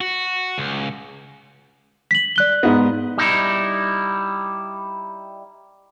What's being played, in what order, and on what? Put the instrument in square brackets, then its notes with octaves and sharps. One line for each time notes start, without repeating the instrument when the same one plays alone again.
[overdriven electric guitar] F#4
C#2
[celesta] B6 F#7
D5 F#6 G7
[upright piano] G#2 B3
[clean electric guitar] G3 D#4 E4